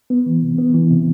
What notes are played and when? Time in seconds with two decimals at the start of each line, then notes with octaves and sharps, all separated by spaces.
0.10 B3
0.26 E3
0.42 C3
0.58 B3
0.74 E3
0.90 C3